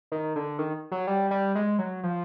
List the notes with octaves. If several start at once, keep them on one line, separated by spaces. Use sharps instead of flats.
D#3
D3
D#3
F#3
G3
G3
G#3
F#3
F3